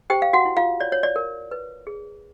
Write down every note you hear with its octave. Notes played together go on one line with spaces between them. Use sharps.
G4 C5 G5
F5
F#4 F#5
E4
F4 F5
C#5 D5
C#5
D5
A#4
B4
G#4